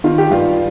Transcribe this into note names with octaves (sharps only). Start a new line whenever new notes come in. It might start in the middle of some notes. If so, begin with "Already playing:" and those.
D#3 F4
G4
G2 F4